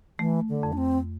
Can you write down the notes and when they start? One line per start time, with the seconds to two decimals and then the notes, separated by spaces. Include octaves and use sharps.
0.19 E3 A3
0.49 D3
0.63 F2
0.73 D4
0.77 C4